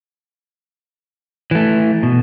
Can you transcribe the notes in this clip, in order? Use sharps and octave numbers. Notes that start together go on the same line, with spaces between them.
E3 A3
B2